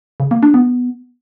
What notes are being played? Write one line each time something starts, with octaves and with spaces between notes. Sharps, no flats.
C#3
A#3
D4
B3